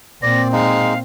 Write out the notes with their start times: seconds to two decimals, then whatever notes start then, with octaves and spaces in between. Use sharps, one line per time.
0.22 A#2 C4 D5 A#6
0.52 G#3 D#4 F5